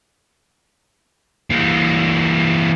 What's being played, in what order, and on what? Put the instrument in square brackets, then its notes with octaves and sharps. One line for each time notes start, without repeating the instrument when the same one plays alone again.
[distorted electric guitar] E3 A#3